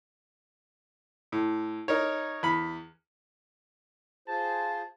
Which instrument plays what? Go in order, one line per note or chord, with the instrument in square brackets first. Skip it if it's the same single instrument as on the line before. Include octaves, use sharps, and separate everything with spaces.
[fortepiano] A2
D#4 A#4 C#5
E2 B5
[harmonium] F4 G#4 C5 [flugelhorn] A5